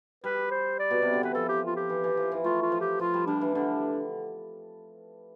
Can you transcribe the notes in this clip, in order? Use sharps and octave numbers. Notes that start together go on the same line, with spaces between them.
G3 B4
C5
D5
B2
C3
D3
E3 B4
F3 A4
G4
F4
G4
E3
E3
F3
E3
A3 F4
F4
F3
G4
F3 F4
G3
G3 D4
E3
D3 D4